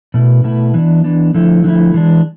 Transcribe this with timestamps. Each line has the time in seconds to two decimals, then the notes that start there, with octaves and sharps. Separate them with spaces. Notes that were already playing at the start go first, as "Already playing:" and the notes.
0.14 B2 A3 E4 B4
0.44 B2 A3 E4 B4
0.74 E3 B3 D4
1.04 E3 B3 D4
1.34 D3 F3 A3 E4
1.64 D3 F3 A3 E4
1.94 E3 G#3 D4